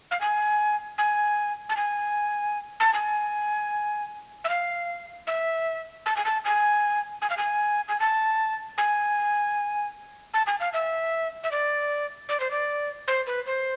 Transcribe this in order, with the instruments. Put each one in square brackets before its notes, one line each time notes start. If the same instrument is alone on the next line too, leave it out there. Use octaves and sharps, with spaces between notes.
[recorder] F5
G#5
G#5
A5
G#5
A5
G#5
E5
F5
E5
A5
G#5
A5
G#5
G#5
F5
G#5
G#5
A5
G#5
A5
G#5
F5
E5
E5
D5
D5
C5
D5
C5
B4
C5